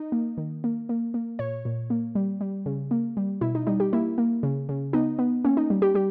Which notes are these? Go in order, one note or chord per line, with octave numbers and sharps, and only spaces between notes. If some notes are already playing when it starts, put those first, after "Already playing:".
Already playing: D#4
A#3
D#3
A#3
A#3
A#3
A#2 C#5
A#2
A#3
G3
G3
C#3
A#3
G3
B2 E4
D#4
G3 D#4
G4
A#3 E4
A#3
C#3
C#3
B3 D#4
B3
A#3 C#4
D#4
G3
G4
G3 G4